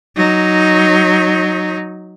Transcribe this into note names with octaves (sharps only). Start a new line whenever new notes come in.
F#3 D#4